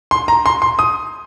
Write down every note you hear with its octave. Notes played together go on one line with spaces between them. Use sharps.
C6
A#5
C6
C6
D#6